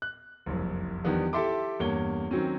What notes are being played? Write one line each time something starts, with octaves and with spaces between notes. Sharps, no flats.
F#6
F#1 C2 F2
E2 D#3 F3 G3 B3 D4
E4 G4 A4 E5 C6 D6
E2 G2 A#3 C#5 G7
D#3 F#3 C4 C#4